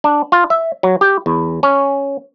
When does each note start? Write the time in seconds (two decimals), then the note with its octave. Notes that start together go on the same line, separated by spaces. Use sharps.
0.04 D4
0.32 F4
0.50 E5
0.83 F#3
1.01 G4
1.26 E2
1.63 C#4